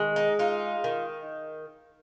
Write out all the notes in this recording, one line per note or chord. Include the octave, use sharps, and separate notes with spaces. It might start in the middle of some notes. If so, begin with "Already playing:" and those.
Already playing: D#3 G#3
D#4
D#4 F4
D#3